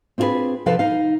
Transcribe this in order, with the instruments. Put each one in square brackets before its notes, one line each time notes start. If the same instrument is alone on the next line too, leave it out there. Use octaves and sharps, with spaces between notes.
[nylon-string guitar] C4 D4 F4 F#4 G#4 B4
C3 F3 F4 A4 B4 F5
D#4 F5